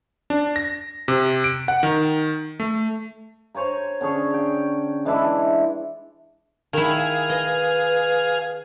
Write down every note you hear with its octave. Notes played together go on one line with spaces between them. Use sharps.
D4
A#6
C3
D7
F#5
D#3
A3
C5 C#5 G#5 A#5
D3 C#4 G#4 C#5
G5
E3 G#3 D4 E4
D#3 E4 G#4 F5
B4 D#5